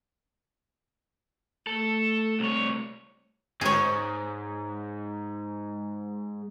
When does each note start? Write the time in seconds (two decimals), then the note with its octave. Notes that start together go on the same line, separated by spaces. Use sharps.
1.67 A3 A4
2.40 C2 C#5
3.61 G#2 G#4 C#5